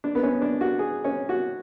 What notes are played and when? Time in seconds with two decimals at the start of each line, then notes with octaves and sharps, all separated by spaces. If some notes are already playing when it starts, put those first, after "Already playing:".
0.04 D4
0.15 B3
0.23 C#4
0.42 D4
0.61 F#4
0.79 G#4
1.04 C#4
1.29 F#4